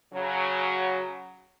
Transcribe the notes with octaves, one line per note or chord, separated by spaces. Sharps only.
C#3 F#3